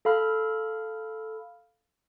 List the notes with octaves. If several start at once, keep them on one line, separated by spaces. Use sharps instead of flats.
A4 F5 B5 F6